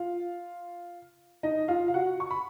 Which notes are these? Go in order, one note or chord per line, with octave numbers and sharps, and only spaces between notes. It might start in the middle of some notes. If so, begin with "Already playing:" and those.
Already playing: F4 F5
D#4 D#5
F4 F5
F5
F#4 F#5
C#6
B5